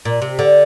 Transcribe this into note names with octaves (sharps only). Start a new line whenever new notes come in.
A#2
C3
D3